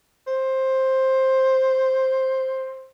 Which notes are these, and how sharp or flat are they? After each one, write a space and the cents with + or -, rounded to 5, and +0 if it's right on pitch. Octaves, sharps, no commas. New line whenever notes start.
C5 +10